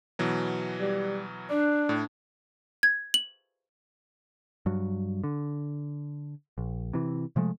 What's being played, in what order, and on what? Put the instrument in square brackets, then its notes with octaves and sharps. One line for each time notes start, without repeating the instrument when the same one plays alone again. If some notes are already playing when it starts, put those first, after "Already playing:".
[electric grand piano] B2 E3 F#3
[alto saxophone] G3
[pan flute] D4 [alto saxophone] D5
[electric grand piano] A2
[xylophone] G#6
F#7
[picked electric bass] G2 F#3
D3
A#1
C3 E3
C3 F3 G#3 A3